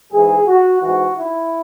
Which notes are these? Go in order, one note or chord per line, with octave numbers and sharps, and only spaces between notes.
G#2 E3 G#4
F#4
G#2 E3 F#4
E4